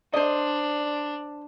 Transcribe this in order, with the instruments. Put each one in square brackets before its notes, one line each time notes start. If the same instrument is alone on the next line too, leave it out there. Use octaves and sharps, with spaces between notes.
[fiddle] D4 [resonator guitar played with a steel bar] C5 D#5 [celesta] D5